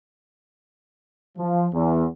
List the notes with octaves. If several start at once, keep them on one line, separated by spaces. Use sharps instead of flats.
F3
E2